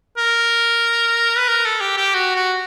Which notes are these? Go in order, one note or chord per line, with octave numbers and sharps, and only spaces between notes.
A#4
B4
A#4
A4
G4
G4
F#4
F#4